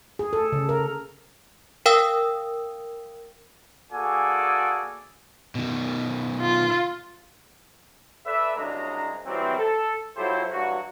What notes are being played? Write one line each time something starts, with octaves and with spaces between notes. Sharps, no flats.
G#4
A4
C#3
A#4
A#4 F5 G5 D#6 E6
A#3 F#4 G#4 A4 D5 G#5
B2 D#3
F4
A4 B4 D5 E5
C2 C#3 F#3 G#3 D4 A#5
E3 F#3 G3 C4
A4
F#3 E4 F4 G4 A4 C5
G2 E3 F#3 F#4